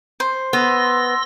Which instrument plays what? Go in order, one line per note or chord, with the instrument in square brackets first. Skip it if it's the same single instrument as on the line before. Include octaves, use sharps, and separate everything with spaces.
[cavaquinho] C5
[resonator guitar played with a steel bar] B3 [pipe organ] C6 E6 A#6